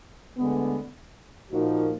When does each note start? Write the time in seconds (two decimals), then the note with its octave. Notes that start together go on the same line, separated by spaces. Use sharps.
0.38 D2 D3 G#3 B3
1.51 A#2 F3 A#3 D#4 F#4